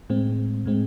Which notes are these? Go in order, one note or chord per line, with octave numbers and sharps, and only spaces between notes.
A2 G#3 C4
A2 G#3 C4